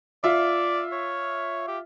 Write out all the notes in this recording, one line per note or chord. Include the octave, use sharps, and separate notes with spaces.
F4 D5 E5
C#5
G4